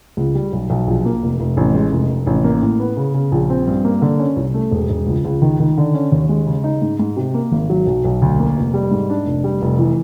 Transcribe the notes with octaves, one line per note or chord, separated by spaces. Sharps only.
C#2
G3
B1
B1
A#1
A#3
F1
F1
A1
G#3
F1
F1
A1
A#3
A2
B3
C#3
C#3
A#1
C4
G2
A#3
D3
C#4
C2
A3
E1
E1
C#2
C#2
D#3
D#3
D3
C#4
D#2
G#3
C#3
D#4
G#2
G#2
C3
A#3
G#1
F#3
B1
B1
D2
A#3
F1
G3
G#2
D4
F1
G3
F1
E3